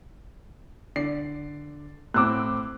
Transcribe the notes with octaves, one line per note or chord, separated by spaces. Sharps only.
D3 D5 C7
A2 C4 D6 E6 F#6